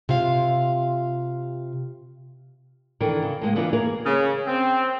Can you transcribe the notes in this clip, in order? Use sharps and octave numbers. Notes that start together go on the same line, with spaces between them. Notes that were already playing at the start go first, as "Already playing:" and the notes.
C3 F4 F5
D#3 E3 D4 A4 A#4
C#3
A2 G#3 A#3
E3 B3 D4 D#4 F4 A#4
A#3 G#4 A#4
C#3
C4